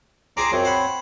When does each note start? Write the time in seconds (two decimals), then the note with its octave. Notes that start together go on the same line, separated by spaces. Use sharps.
0.37 C4 G#4 C5 A#5 D6
0.52 F#2 C4 C#5
0.65 C5 F#5 B5